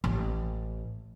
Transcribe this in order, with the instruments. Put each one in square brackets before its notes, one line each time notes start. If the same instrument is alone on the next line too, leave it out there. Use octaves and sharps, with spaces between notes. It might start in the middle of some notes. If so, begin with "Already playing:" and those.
[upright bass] A1